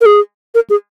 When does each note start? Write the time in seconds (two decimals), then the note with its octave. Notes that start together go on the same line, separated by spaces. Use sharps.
0.01 A#4
0.06 G#4
0.55 A#4
0.70 G#4